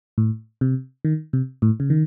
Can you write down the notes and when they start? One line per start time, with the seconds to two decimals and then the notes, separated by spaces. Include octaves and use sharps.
0.18 A2
0.61 C3
1.05 D#3
1.33 C3
1.62 A2
1.80 C#3
1.90 D#3